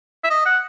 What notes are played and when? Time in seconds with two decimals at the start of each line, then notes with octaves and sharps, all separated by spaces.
0.24 E5
0.30 D#5
0.46 F#5